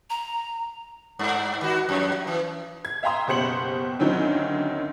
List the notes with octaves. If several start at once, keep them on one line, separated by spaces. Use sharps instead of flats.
A#5
G2
D#3 F#4
F2
E3
G#6
E5 F5 G5 A#5 C6 D#6
F#1 B2 G4 C5 C#7 F#7
D2 D3 D#3 F#3 C4 C#4